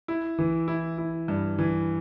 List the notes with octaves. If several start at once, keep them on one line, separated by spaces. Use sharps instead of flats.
E4
E3
E4
E4
G2
E3